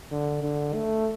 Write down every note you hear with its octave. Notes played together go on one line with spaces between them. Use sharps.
D3
D3
A3